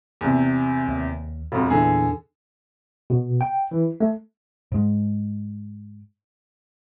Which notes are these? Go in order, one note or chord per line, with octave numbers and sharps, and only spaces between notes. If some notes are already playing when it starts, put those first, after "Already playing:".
E2 C3
D#2
E1 F2 F4 F#4
E2 A#2 D3 E3 G#4
B2
G5
E3
A3
G#2 G#3